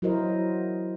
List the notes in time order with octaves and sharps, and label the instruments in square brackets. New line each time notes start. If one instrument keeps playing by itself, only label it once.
[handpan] F#3 E4 F#4 A#4 C5 D#5